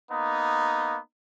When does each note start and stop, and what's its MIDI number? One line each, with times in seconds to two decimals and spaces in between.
0.11 0.98 58
0.11 0.98 59
0.11 0.98 63